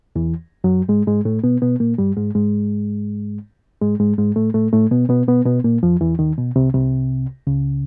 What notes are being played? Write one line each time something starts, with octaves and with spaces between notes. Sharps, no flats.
E2 E3
F#2 F#3
G#2 G#3
G#2 G#3
A2 A3
B2 B3
B2 B3
A#2 A#3
G2 G3
G#2 G#3
G#2 G#3
G#2 G#3
G#2 G#3
G#2 G#3
A2 A3
A2 A3
A2 A3
B2 B3
B2 B3
B2 B3
B2 B3
A#2 A#3
F2 F3
E2 E3
D#2 D#3
B2
C2 C3
C2 C3
C#2 C#3